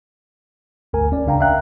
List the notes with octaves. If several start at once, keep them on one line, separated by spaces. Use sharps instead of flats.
G1 D2 A#4 G#5
D#2 C#4 D5
C#2 C#3 D4 F5 G5 A#5
E5 F5 G5 A#5 F#6